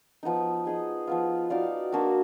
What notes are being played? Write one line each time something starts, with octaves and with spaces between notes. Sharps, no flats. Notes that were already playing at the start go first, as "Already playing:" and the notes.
F3 B3 D#4
D#4 G#4 D#5
F3 B3 F4
D#4 F#4 D5 F5
A#3 D4 F#4